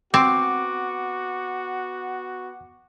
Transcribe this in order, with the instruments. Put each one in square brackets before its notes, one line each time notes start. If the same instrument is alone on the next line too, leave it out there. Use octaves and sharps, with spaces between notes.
[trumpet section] B3 F#4 [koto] C4 [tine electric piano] D6